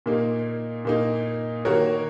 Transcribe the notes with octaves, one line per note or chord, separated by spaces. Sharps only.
A#2 A#3 D#4
A#2 A#3 D#4
D#3 A#3 F#4 A#4 C#5